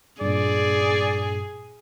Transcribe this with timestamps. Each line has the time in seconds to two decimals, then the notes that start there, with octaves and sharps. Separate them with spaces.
0.21 G2 A#2 G#4 D5